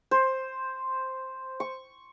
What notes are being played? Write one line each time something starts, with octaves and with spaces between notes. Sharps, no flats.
C5
C#6